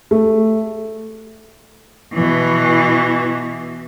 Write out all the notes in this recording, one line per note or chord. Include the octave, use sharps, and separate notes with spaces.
A3
B2 E3